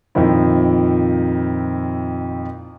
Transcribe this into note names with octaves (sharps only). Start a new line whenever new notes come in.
F2 A#2 D#3 F3 E4